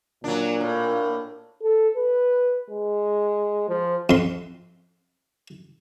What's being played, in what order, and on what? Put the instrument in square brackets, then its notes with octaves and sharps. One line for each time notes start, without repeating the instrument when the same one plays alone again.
[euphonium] A#2 [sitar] F#3 D4
[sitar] A2 [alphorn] A#3
[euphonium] A4
B4
G#3
F3
[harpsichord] F2 C6